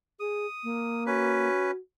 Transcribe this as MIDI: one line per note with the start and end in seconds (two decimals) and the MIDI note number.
0.20 0.46 68
0.20 1.04 87
0.64 1.48 58
1.06 1.71 61
1.06 1.79 66
1.06 1.71 71